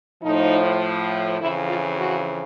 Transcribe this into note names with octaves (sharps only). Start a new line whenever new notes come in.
A2 F3 D#4
F2 C#3 E3 E4
F4
F#4